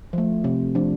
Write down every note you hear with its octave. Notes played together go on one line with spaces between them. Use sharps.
F3 A3
C3
F3 A3 D4